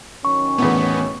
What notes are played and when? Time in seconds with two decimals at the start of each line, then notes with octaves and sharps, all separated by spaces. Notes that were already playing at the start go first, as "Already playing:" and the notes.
0.25 D#3 F#3 C#4 C#6
0.58 E2 A2 B3